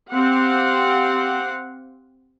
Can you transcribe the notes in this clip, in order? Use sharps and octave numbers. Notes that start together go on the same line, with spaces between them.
C4 G4 F5 F#5